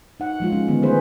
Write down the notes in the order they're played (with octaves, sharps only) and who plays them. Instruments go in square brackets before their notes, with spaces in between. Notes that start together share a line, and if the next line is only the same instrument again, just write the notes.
[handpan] D#4 F#5
F3 G#3 F4
G#3 C#4
D3 D#3 A#3 B3
A3 C4 G#4 B4 C5